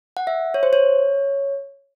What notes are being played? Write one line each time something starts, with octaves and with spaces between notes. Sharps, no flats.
F#5
E5
C#5
C5
C#5